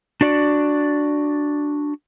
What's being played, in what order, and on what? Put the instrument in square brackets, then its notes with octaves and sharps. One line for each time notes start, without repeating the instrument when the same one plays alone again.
[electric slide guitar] D4 F#4 D5